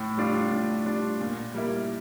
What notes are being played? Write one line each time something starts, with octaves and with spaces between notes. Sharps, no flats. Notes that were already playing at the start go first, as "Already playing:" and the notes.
Already playing: A2
G3 D4 F4
A2
G3 D4 F4
A#2
G3 A#3 E4